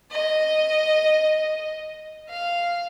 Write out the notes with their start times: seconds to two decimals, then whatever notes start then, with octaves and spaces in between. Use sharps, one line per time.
0.12 D#5
2.29 F5